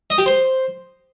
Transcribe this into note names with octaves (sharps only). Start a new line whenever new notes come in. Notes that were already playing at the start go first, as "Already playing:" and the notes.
D#5
G4
C5